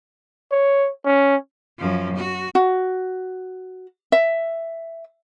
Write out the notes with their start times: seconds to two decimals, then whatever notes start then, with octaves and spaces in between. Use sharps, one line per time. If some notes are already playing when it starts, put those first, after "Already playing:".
0.51 C#5
1.06 C#4
1.78 F#2 F3
2.16 F#4
2.55 F#4
4.12 E5